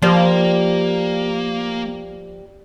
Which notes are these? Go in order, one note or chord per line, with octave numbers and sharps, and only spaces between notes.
F3 G3 A#3